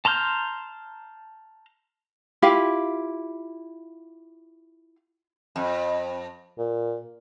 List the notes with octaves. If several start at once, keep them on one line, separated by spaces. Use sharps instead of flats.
A5 A#5 C6 F6 G6
E4 F4 G4 F5
F2
A#2